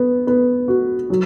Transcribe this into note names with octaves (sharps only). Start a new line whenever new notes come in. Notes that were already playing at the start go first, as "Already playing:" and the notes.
Already playing: B3
B3
F#4
F#3